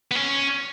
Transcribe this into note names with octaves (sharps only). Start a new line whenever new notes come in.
B3
C#4